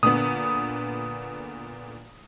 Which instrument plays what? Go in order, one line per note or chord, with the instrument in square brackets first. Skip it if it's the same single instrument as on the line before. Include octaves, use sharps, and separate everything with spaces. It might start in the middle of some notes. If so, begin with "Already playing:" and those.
[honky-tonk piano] A#2 D3 B3 [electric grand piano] D#6